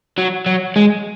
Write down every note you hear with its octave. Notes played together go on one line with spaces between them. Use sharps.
F#3
F#3
G#3